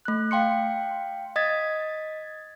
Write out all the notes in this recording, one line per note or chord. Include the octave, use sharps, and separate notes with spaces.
A3 F#6
F5 G5 C6 C#7
D#5 D#6 G#6 A6 B6